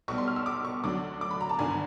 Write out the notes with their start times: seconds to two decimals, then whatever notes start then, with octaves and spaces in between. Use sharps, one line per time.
0.08 B1 B2 G3 C#6
0.18 C6
0.28 F6
0.36 E6
0.46 D6
0.65 C#6
0.84 D2 D3 F#3 D6
1.21 D6
1.31 B5
1.41 A#5
1.49 A5
1.59 G#1 G2 D3 G#5